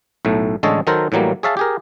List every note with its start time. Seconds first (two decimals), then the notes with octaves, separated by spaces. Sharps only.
0.25 B1 A2 A3
0.63 A1 D3 G#3 A4 C#5 D#5
0.87 D#3 F#3 A4 A#4 C5
1.12 A2 E3 F#3 G3 A#3
1.43 G#4 C#5 E5 F5 A5
1.57 G4 G#4 A#4